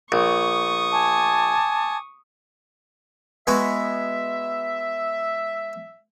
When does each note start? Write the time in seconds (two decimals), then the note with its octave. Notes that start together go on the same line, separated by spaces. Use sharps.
0.12 A#1 C#6 D#6
0.91 G#5 A5 D6
3.47 G#3 B3 F#4 E5